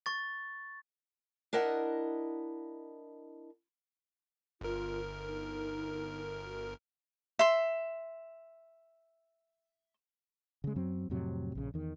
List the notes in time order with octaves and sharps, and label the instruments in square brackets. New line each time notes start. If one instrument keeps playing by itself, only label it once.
[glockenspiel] C#6 A6
[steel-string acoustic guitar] D4 E4 A#4 D#5 F#5
[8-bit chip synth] G1 A#4 [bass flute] F4
[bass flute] D#4
F#4
[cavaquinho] E5 C6
[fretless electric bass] C#3 G#3
F#2 F#3 C4
F2 A2 C3 F#3
A#1 C#3
E2 D#3